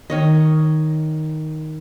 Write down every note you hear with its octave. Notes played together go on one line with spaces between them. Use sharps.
D#3 C#5 D#5